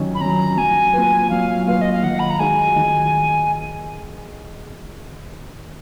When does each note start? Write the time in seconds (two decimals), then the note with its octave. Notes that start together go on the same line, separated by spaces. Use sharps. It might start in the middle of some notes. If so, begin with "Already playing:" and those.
Already playing: D#3 F#3 C#4
0.15 B5
0.21 F#3 C#4 A#5
0.57 F#3 G#5
0.94 A#3 F4 B4
1.30 F#3 F5
1.66 A#3 F4 B4 F5
1.81 D#5
1.92 F5
2.03 D#3 F#5
2.19 B5
2.30 A#5
2.39 G#3 D#4 F#4 G#5
2.76 D#3